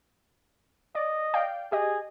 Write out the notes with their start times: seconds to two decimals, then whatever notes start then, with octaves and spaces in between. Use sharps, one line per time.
0.95 D5 D#5
1.34 D5 F5 G5
1.72 G4 G#4 D#5